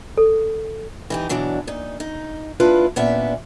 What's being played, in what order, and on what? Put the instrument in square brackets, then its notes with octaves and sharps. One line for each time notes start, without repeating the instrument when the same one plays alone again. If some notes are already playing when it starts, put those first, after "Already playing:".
[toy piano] A4
[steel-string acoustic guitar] E3 D#4 G4
B2 E3 F#3 D4 E4
A#2 D#4
D#4
A#3 D4 E4 F4 B4
A#2 B3 C#4 D4 E5